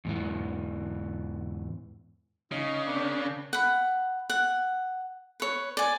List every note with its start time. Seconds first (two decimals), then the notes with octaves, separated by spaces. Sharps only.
0.05 E2 G#2 E3
2.52 C#3 D#4 D#5
2.86 A#3 C4 D4
3.53 F#5 B5
4.30 F#5
5.40 B4 C#5
5.77 D5 G#5